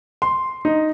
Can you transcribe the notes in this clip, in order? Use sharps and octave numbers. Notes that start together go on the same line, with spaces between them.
C6
D#4